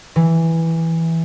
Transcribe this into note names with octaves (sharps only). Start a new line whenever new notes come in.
E3